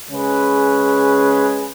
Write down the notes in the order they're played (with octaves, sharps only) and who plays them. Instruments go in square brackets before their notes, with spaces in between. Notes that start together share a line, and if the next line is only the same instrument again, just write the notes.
[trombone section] C#3 G#3 C#4 G#4 B4